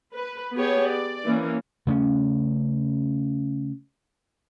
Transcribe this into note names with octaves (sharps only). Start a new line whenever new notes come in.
B4
B3 G4 G#4 C#5
D5
E3 A#3 C#4
C#3 A3 B3 C#4